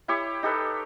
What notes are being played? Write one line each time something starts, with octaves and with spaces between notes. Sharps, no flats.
E4 G4 C#5
D#4 G4 A4 B4